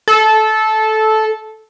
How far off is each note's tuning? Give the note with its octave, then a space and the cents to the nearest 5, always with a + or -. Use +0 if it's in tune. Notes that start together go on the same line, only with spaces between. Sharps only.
A4 -15